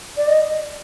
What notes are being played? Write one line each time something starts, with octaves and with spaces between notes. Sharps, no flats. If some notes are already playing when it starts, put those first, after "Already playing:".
D5
D#5